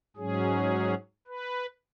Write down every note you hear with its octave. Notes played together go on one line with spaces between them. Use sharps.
G#2 F#3 C#4 G#4
B4